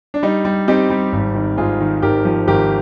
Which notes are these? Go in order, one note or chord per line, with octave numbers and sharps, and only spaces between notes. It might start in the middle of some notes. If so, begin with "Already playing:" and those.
D4
G3 D#4
G3
C4 D#4 G4
G3
G#1
D#3
G#2 F4 G#4
D#3
G#1 G4 A#4
F3
G#1 G4 A#4